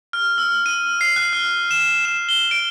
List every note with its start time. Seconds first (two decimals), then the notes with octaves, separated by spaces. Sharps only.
0.13 F6
0.38 E6
0.66 D#7
1.01 C7
1.16 F#6
1.33 F6
1.71 E7
2.05 E7
2.29 G7
2.51 D7